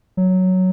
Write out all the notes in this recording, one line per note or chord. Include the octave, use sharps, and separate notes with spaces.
F#3